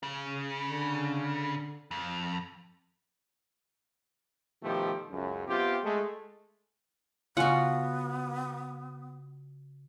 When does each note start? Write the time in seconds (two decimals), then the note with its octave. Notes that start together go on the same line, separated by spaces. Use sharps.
0.03 C#3
0.65 D3
1.91 F2
4.63 B2 D#3 F3 A3 G4
5.10 C#2 F#2
5.47 C3 B3 F4 G4
5.83 G#3 A3
7.37 C#3 B3 F4 F#4 F#5 G#5